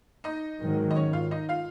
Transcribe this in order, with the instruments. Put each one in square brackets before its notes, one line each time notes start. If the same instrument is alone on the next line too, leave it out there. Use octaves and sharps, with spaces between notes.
[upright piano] D#4 D#5
[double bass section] G#2 D#3 F#3
[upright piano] D#5
C#4 C#5
F4 F5
D#4 D#5
F4 F5